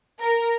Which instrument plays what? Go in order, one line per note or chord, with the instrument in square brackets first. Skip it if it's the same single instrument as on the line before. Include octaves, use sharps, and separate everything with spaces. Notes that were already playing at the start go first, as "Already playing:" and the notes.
[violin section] A#4